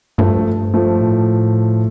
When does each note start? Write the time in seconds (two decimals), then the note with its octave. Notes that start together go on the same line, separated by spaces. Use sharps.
0.18 G2 F3 A3
0.74 F3 A3
1.00 A2